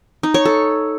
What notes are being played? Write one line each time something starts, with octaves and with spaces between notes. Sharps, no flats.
D#4
C#5
A4